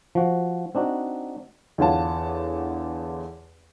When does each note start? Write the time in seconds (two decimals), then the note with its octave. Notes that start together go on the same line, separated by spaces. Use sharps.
0.15 F3 F#4
0.75 C4 D4 D#4 F#4
1.78 E2 D3 F4 C#5 F#5 A5